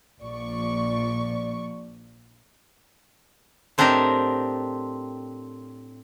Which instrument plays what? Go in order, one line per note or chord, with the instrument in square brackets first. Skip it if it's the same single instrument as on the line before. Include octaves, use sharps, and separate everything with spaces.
[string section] A#1 A#2 F3 D5 C#6
[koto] A2 C4 D4 G4 A#4 D#5